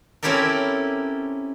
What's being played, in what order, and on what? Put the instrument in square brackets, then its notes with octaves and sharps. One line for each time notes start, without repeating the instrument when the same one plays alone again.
[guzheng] C4 C#4 E4 G4 A4 A#4